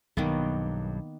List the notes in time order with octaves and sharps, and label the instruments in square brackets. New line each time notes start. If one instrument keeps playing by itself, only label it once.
[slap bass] B1 G2 [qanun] D#3 A#3 B3